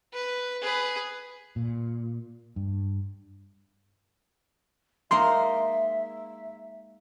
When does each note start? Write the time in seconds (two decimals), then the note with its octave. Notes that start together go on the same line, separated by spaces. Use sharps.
0.13 B4
0.62 G#4 B4
1.56 A#2
2.56 G2
5.11 G#3 A#3 D#4 E5 C6